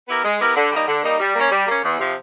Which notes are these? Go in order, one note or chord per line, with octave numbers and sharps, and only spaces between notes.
B3 E4 G4 A#4
G#3
B3 E4 G4 A#4
D3
G3 A#3 D#4
D3
G3 A#3 D#4
G3
A#3 C#4
G3
A#3 C#4
E2
C3 F3